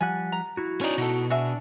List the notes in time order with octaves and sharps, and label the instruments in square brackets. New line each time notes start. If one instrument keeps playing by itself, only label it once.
[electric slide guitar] F3 G3 F#5 [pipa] G#5
[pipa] A#5
[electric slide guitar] E4 F#4
[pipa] C#3 G3 D#4 [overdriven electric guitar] C#4 D5
[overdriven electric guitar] B2 [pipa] D#4 A4
[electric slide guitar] D4 [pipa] F#4 G#4 E5